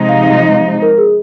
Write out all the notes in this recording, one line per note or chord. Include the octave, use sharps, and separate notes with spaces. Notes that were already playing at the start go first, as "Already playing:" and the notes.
Already playing: C3 F3 G#3 D#4
F5
F5
D#5
F5
C5
A#4
G#4